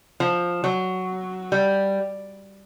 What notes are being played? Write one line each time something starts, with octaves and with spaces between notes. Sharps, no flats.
F3
F#3
G3